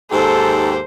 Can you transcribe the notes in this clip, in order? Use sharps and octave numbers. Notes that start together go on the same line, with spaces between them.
D#2 G#2 G4 A4 C5